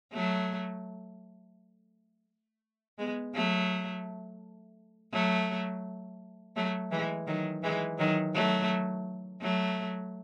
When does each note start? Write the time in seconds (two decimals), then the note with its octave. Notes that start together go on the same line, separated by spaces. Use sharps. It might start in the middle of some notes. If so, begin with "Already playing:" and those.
0.13 F#3 A3
2.98 G#3 B3
3.35 F#3 A3
5.13 F#3 A3
6.56 F#3 A3
6.91 E3 G#3
7.27 D#3 F#3
7.63 E3 G#3
7.98 D#3 F#3
8.34 F#3 A3
9.42 F#3 A3